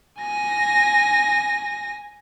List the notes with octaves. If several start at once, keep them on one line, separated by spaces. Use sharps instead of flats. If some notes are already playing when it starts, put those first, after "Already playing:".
G#5 A#6